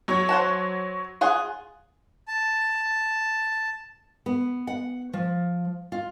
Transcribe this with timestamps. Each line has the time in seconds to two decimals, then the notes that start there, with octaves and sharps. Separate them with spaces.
0.08 F#3 C#5
0.29 C5 F#5 A5
1.21 F4 G#4 F#5
2.28 A5
4.26 B3
4.67 F#5
5.13 F3
5.92 F4